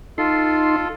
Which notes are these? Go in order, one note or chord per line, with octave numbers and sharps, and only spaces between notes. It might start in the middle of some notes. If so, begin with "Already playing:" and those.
D#4 F4 A4 C6